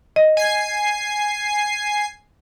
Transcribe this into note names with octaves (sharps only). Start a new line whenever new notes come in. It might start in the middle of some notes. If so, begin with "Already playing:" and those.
D#5
G#5 C7